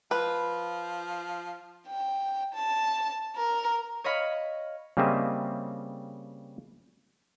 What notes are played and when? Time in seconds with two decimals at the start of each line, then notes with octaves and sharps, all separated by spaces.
0.11 F3 B4
1.87 G5
2.53 A5
3.36 A#4
4.04 C#5 D#5 F5 B5
4.97 C#3 G3 A#3 C4 D#5 E5